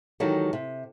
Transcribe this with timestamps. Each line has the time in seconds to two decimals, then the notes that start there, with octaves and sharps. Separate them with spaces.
0.20 D#3 E3 F#3 G#3 G4 A4
0.53 C3